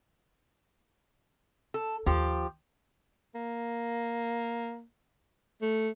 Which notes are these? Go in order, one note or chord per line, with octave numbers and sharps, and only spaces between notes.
A4
D#2 F3 G4
A#3
A3